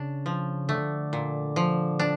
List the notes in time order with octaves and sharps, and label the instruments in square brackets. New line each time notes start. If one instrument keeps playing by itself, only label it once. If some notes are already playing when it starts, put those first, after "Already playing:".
Already playing: [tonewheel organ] C#3 [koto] D4
[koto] F3
[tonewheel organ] D3 [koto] A3
[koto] A#2
F3
D4